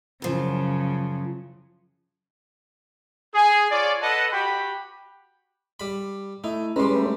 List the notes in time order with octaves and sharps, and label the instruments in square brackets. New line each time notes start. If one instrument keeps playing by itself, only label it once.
[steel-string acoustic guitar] F#2 F3 [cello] C#3 F#3
[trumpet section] G#4
F4 G#4 C#5 D5
A4 B4 D#5 F#5 A5
F#4 G4 G5 B5
[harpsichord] G3 B5
[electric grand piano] A3 E4 [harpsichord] D#4
[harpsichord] G3 G#3 [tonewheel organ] C#4 B4 [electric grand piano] A#5 C6
[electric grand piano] A3